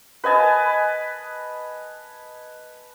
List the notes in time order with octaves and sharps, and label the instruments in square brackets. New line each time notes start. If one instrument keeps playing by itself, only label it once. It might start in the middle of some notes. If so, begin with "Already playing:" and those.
[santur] B4 D#5 G#5 A5